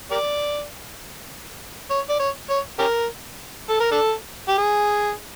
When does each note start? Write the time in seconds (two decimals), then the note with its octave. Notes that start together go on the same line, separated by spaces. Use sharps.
0.11 G4 A#4 D5
1.90 C#5
2.09 D5
2.20 C#5
2.50 C#5
2.79 C#4 G4 A#4
3.70 A4
3.80 A#4
3.92 D4 A4
4.48 G4
4.58 G#4